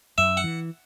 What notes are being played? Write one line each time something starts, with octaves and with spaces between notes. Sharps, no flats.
F#2 E5
F#5
E3